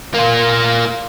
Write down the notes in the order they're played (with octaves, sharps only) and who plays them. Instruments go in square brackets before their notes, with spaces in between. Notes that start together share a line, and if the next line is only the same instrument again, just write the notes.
[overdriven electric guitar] A#3 F4